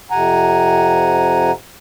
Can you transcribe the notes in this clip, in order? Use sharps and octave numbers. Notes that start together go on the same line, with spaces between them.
F2 C3 F#5 G#5 A#5